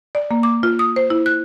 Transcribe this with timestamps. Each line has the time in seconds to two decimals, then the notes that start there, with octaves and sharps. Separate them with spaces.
0.15 D5
0.31 A#3
0.43 D6
0.63 F4
0.79 D#6
0.96 C5
1.10 E4
1.26 F#6